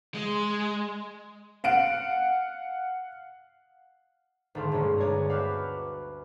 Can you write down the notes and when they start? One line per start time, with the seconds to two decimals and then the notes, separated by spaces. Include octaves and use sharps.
0.14 G#3
1.64 F5 F#5 D7
4.55 G#1 D2 A4 F5 C6
4.72 G2 B2 G#3 A#3 C#4
4.98 D2 C#5 D5 A#5
5.29 F#4 G4 B4 E5 F5 D6